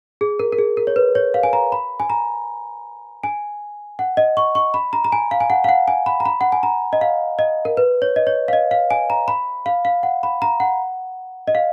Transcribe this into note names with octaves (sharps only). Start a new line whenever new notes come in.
G#4
A#4
A#4
G#4
A#4
C#5
B4
C#5
F5
G#5
A#5
B5
G#5
A#5
G#5
F#5
D#5
C#6
C#6
B5
A#5
A#5
G#5
F5
G#5
F#5
F5
F#5
G#5
B5
A#5
B5
F#5
G#5
A#5
D#5
F5
D#5
A#4
B4
C#5
D#5
C#5
F5
D#5
F5
G#5
A#5
B5
F5
F5
F#5
B5
A#5
F#5
D#5
F5